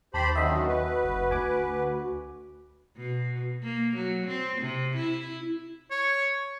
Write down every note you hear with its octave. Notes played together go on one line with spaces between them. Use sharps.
D#2 G4 C5 A5 B5
F#2 D3 D#3 D#5 E5
F#4
B4
F#1
D2 G#5 D6
B2
A#3
F#3
C4
C3
E4
C#5